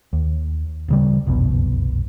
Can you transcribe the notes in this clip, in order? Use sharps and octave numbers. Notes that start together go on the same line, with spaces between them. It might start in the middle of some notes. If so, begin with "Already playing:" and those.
D#2
D1 C#3 G3
F#1 C2 F2 B2